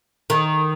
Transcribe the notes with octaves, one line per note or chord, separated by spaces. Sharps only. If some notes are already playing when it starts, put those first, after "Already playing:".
D#3